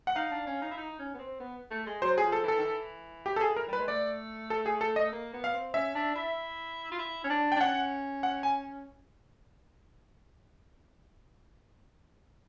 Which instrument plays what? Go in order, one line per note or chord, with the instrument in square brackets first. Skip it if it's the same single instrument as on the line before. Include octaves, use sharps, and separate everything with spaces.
[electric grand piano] F#5
[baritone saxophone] D#4 [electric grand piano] F5
[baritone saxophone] D4
C#4
D#4
E4
D#4
C#4
B3
C4
B3
A3
G#3
[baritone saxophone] F#3 [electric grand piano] C5
[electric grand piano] G#4
[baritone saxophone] F3
[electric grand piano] A4
[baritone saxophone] E3 [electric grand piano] A4
[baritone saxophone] D#3
E3
[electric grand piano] G4
A4
G#4
A#4
[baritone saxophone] G3
[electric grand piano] B4
[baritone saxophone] G#3
[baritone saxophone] A3 [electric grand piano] D5
[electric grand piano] A4
G#4
A4
D#5
[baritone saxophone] A#3
B3
[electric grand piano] F5
[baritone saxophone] C4
[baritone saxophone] C#4 [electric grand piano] E5
[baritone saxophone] D4
E4
F4
E4
C#4
D4
[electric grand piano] G5
[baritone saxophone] D4
[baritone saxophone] C#4 [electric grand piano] F#5
[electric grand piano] F#5
G#5